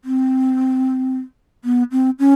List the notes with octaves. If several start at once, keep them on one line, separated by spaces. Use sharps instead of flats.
C4
B3
C4
C#4